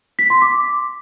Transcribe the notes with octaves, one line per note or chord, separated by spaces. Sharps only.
B6
C6
D6